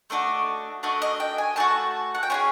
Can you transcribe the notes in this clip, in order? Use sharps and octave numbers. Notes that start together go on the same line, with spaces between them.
A3 D4 F#4 D#5
A3 D4 F#4 D#5
D#5
G5
G#5
A3 D4 F#4 A5
F#5
G5
C#4 F4 G#4 G#5